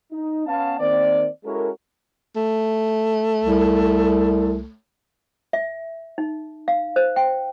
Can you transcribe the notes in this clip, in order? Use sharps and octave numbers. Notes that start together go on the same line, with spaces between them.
D#4
B3 C#4 F5 A5
D#3 A#3 C4 D5
G#3 C#4 E4 F#4 A4 A#4
A3
C2
E5
D#4
F5
C5
G5